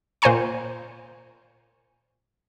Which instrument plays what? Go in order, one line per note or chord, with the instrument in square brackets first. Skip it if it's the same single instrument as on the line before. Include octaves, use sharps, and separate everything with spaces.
[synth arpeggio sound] A#2 C5 G5 G#5 A#5 C#6